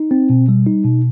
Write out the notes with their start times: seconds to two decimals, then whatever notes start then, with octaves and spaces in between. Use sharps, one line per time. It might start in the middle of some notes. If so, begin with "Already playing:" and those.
Already playing: D#4
0.11 C4
0.30 B2
0.49 G3
0.67 D#4
0.84 B2